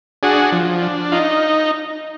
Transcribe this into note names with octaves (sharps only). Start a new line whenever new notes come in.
D4 F#4 G#4
F3
D4
D#4 F4